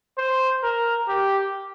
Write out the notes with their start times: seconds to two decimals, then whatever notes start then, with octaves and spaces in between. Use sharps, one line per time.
0.18 C5
0.63 A#4
1.08 G4